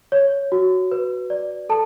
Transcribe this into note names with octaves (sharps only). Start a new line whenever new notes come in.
C#5
F#4
B4
D5
A4 A5